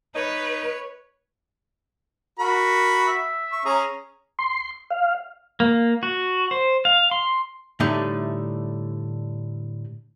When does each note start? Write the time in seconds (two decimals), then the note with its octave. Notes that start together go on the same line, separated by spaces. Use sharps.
0.15 D#4 B4 C#5
2.39 F#4 A#4 B5
3.08 E5
3.52 C#6
3.66 C#4 G#4 A#5
4.39 C6
4.90 F5
5.60 A#3
6.03 F#4
6.51 C5
6.85 F5
7.11 C6
7.80 A2 D3 G3 A3 D#4